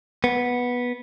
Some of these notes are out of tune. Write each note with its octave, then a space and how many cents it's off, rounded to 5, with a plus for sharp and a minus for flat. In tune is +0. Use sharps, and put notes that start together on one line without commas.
B3 -10